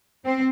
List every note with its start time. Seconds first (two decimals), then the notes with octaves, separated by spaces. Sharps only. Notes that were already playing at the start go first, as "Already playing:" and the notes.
0.25 C4